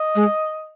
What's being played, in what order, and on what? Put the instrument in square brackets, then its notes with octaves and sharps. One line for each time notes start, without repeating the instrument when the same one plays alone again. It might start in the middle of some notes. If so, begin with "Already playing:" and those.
Already playing: [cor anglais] D#5
[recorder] G#3